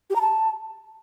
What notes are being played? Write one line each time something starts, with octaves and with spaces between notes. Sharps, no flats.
G4
A#5
A5